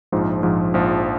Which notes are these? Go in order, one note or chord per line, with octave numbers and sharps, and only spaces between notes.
A#1 G#2 F3
A#1 G#2 F3
A#1 G#2 F3